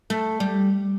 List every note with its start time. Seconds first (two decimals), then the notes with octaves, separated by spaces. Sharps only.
0.10 A3
0.40 G3